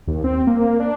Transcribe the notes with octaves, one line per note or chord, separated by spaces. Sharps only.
D#2
C4
A#3
D4